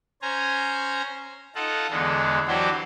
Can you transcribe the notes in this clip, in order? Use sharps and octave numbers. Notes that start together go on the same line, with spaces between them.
C#4 C5 G#5 A#5
D#4 F4 A4 F#5
E2 D3 G#3 B3
E3 F#3 D4 F#4 G4 C5